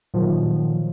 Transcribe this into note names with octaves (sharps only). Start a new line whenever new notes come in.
A#2 D#3 F3 F#3